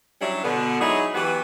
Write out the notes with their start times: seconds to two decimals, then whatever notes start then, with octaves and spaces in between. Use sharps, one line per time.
0.21 F#3 G3 C#4 D4 E4
0.44 B2 D3 B3
0.80 F#3 G#3 D#4 E4 G#4 C#5
1.14 E3 F#3 B3 F#4 G4 B4